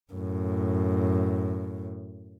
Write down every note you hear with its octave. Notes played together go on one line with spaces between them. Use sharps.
F#2 A2